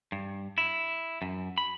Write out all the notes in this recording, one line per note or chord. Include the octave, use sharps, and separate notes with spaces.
G2
E4
F#2
B5